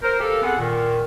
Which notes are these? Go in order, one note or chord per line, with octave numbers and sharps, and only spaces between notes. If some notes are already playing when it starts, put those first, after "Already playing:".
A#4 C5
G4 A4 A#4 F5
B3 C4 G#4 A4 F#5
A#2 D#3